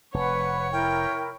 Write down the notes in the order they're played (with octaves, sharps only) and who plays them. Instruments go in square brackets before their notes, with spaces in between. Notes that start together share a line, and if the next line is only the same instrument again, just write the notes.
[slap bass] F1 [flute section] B4 F#5 [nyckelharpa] C#5
[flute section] E4 A#4 [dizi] G5